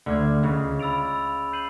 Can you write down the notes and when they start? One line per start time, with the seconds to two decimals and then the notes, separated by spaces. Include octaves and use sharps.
0.06 D2 D3 D6 F6 G#6
0.43 C#2 C#3
0.80 B5 E6 A6 D7 F7
1.53 G6 C7 D#7 F#7